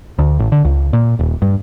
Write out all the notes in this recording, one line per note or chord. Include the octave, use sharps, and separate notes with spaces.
D2
A1
D3
C#2
A#2
D#1
G2